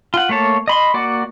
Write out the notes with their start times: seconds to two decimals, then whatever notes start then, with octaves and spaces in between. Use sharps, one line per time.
0.14 F4 F#5
0.29 A3 A#3 C#5 A5
0.68 D#5 B5 C6
0.94 A#3 F#4 D5 F#5